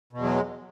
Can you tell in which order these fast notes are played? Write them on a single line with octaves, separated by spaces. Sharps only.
B2 E2 F#3 G#3